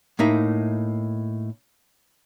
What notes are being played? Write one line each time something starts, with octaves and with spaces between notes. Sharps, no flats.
A2 A#3 D#4 E5